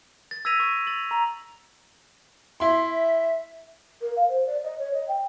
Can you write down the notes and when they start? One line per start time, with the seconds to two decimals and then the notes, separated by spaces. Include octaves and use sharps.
0.31 A6
0.45 E6 G#6 A#6 B6 D#7 F7
0.60 C#6
0.87 A6 F7 F#7
1.11 A#5 F7
2.60 E4 E5 C6
4.01 A#4
4.16 F5
4.29 C5
4.47 D5
4.64 D#5
4.78 C#5
4.93 D#5
5.08 G5